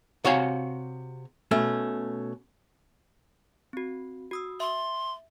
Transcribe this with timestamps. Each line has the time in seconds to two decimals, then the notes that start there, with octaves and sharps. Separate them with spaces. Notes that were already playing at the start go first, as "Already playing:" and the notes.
0.25 C3 F#4 C#5 F5 G#5
1.51 B2 A3 C#4
3.73 C4 F#4
4.31 F#4 D#6 E6
4.60 E5 C6